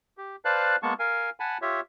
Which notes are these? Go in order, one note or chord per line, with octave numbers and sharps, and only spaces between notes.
G4
B4 C5 D5 F5 A5 F#6
G#3 A#3 B3 A5 C#6
A#4 F5 G#5
F#5 G#5 A5 B5
F4 G4 C#5 E5